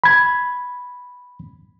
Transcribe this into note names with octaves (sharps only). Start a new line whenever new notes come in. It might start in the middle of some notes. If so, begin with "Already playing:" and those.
B5 G#6